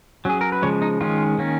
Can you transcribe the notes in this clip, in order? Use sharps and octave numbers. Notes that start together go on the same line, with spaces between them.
F#3 C#4 G#4
A#4
B4
C#3 F3 G#3 C#5
D#4
D#3 G#3 C#4 F4
D#3 A#3 C#4